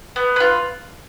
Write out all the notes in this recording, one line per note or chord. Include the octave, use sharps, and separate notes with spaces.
B3
F4 B4